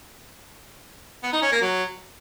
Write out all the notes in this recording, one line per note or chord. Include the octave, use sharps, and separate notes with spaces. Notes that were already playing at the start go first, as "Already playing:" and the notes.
B3
D#4
C#4
A#3
F#3